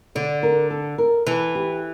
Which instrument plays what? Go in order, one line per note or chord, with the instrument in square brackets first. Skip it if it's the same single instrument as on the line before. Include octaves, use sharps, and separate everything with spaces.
[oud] D3 [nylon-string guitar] D5
[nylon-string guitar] A#4
A4
A#4
[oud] E3 [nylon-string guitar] A4
[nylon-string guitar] G4